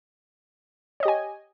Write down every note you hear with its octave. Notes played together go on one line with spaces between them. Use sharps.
G4 C#5 D#5 G#5